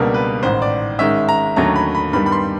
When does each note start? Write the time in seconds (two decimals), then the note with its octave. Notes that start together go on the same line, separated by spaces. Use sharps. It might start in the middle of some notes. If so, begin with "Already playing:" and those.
Already playing: C#2 B2 G3 A#3 D4 A#4
0.14 B4
0.43 A1 G#2 D#3 C5
0.62 D5
0.99 G#2 D#3 G#3 C#4 E5
1.29 A#5
1.56 D#2 D3 F#3 A3 C#4 A#5
1.76 B5
1.95 B5
2.13 G2 D#3 G3 B3 B5
2.26 B5
2.32 C6